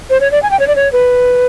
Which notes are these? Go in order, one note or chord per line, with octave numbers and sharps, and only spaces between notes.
C5
C#5
D5
G#5
G5
C#5
D5
C#5
B4